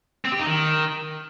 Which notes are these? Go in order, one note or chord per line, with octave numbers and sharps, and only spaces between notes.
C4
G4
D#4
D#3